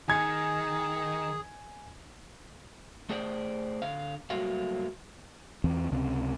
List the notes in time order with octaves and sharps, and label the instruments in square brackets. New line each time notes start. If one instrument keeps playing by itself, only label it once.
[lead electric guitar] D#3 [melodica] G#4 [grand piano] G#5 G#6
[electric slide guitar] A3 G#4 C5 D5
D3 F5
F#3 G3 A3 A#3 F#4 F5
[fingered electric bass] E2 E3 C4
C#2 C3 C4 C#4